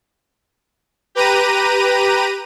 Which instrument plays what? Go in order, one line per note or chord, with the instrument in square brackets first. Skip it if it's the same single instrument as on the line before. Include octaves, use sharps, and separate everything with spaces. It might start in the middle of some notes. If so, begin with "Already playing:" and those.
[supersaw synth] G4 B4 A#5 D#7